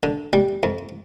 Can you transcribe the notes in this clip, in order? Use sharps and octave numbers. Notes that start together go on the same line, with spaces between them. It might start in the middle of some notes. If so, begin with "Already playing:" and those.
D3
G3
F2